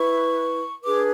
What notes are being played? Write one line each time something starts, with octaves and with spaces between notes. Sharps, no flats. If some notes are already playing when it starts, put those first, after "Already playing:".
Already playing: E4 B4 C#6
D4 G#4 B4 D6